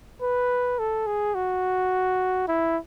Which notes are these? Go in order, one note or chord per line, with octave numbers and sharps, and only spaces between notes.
B4
A4
G#4
F#4
E4